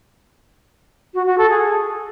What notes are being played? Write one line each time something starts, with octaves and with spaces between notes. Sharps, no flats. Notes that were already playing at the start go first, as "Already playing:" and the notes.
F#4
F#4
A4
G#4